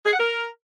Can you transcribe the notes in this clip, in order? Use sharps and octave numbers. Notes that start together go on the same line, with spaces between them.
G#4
F#5
A#4